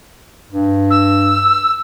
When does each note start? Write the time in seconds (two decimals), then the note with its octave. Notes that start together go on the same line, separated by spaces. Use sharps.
0.50 G2
0.90 E6